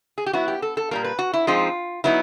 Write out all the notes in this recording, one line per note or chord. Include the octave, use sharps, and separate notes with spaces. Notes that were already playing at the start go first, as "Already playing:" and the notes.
G#4
G4
F#3 B3 E4 F#4
G4
A4
A4
A#2 G3 A#3 A#4
B4
F#4
E4
F3 G#3 C4 D#4 F4
F#3 B3 D#4 E4